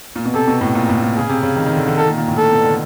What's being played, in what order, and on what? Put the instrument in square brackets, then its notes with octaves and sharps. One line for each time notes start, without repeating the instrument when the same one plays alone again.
[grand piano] A#2
B2
[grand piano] C3 [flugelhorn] A4
[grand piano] B2
A2
A#2
A2
A#2
[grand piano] C#3 [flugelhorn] G#4
[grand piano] C3
C#3
D#3
D#3
D3
D3
[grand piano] D#3 [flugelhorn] A4
[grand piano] A#2
A#2
A2
[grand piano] A#2 [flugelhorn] A4
[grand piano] B2
D3